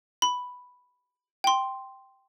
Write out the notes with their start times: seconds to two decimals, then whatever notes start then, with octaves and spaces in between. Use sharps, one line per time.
0.22 B5
1.44 G5 C6